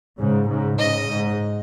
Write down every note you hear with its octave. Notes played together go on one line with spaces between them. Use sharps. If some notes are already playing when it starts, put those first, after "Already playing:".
G#2 C#3
G#2 C#3
G#2 C#3 D#5
G#2